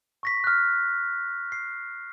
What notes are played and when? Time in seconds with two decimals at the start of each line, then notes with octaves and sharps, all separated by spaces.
0.23 C#6 A#6 B6
0.44 F6 F#6
1.52 C7